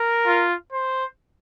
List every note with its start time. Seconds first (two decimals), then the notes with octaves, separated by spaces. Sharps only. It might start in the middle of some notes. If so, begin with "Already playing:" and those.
Already playing: A#4
0.26 F4
0.72 C5